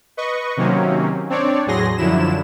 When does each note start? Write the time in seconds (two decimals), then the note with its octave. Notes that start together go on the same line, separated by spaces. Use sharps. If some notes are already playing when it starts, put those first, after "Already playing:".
0.17 B4 D#5 C#6
0.57 C3 D#3 F#3 A#3 C4 C#4
1.30 C4 D4 C#5 D5
1.66 E2 A2 F#3 G#4 C6 A#6
1.97 F#2 D3 F3 F#3 E4 E7